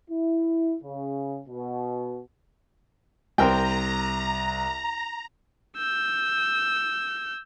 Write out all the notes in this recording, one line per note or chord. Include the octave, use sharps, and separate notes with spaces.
E4
C#3
B2
C2 C4 A#4 G5 A#5
E6 G6